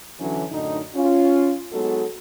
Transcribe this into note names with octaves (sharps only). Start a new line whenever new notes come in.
D3 E3 F#3 C#4 D4 E4
F#2 A2 D3 D#4
C#4 F4
F#3 G#3 B3 D#4 F#4 A4